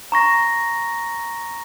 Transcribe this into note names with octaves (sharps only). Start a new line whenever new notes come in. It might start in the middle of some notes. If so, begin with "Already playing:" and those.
A#5 C#6 A#6